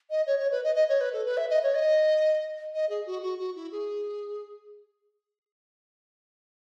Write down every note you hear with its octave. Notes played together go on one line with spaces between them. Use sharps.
D#5
C#5
C#5
B4
D#5
D#5
C#5
B4
A4
B4
E5
D#5
C#5
D#5
D#5
G#4
F#4
F#4
F#4
E4
G#4